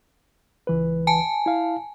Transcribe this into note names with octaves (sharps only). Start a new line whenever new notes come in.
C#2 E3 B4
G#5 A5
E4 F5